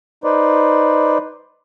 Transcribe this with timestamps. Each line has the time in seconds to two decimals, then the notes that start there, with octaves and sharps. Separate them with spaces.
0.24 D#4 B4 C5 D5